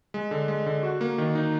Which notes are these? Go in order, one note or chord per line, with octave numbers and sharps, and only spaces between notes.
G#3
D3
G#3
D3
F#4
A#3
D#3
D#4